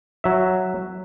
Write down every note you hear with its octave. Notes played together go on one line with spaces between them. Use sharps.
F#3 E5